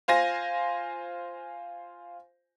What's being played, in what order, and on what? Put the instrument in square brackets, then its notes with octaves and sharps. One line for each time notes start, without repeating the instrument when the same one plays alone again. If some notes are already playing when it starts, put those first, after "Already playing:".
[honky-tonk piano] F4 C5 G#5 A#6